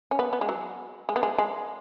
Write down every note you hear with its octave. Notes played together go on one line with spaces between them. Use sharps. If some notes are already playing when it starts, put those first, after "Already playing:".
C#4
B3
B3
G#3
F#3
G#3
B3
G#3
G#3